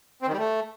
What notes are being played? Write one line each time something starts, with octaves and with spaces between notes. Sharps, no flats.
C4
D#3
G3
A3